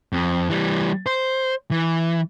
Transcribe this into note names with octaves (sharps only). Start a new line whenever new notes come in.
F2
E3 G3
C5
E3